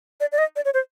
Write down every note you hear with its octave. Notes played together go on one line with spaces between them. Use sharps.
D5
D5
D#5
D5
C#5
C5